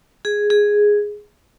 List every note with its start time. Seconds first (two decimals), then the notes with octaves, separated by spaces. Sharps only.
0.25 G#4
0.50 G#4